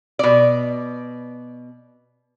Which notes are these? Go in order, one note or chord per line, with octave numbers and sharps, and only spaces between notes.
B2 D5